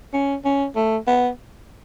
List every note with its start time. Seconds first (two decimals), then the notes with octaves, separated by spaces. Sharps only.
0.13 C#4
0.45 C#4
0.75 A3
1.07 B3